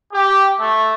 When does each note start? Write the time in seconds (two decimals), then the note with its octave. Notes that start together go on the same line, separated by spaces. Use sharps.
0.13 G4
0.60 A3